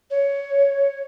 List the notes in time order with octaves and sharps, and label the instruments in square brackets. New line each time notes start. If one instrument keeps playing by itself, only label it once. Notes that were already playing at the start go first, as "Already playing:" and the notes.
[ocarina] C#5